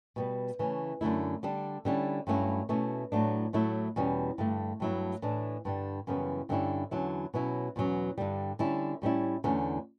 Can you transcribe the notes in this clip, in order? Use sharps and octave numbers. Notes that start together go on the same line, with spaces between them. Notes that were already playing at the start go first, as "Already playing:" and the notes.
B2 G3 B3
C#3 E3 A3 C#4
F#2 D3 A3 E4
D3 G3 D4
D3 G3 C#4 E4
G2 F#3 A3 C#4 E4
B2 A3 C#4 E4
A2 F#3 A3 D4
A2 F#3 A3 E4
E2 B2 G3 C#4
G2 D3 A3
G2 F#3 A3 E4
A2 E3 A3 D4
G2 D3 G3
F#2 C#3 E3 G3 B3
G2 D3 G3 C#4 E4
E2 D3 F#3 C#4 E4
B2 F#3 C#4 E4
E2 B2 F#3 C#4
G2 D3 G3
D3 G3 C#4 E4
A2 G3 C#4 E4
E2 D3 A3 C#4